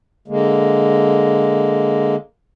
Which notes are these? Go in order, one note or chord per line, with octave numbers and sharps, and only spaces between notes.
D3 G#3 A#3